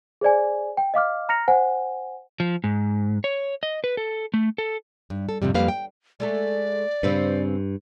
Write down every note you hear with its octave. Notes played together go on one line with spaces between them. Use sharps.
G#4 C5 D5 G#5
G5
D#5 F5 D6 F6
A#5 F6 A#6 C#7 F7
C5 F#5 G#5
F3
G#2
C#5
D#5
B4
A4
A3
A4
G2
A4
F2 G#2 C3 G3
F2 G3 A#3 B4 F5
G5
G#3 A3 A4 D5
G2 C#3 C4 B4